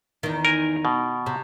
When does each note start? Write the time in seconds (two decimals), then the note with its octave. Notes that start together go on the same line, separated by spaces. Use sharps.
0.23 E2 D#3
0.45 A#4 G#5
0.85 B2
1.26 C3